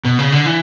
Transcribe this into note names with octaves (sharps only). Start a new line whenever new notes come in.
B2
C#3
D3
E3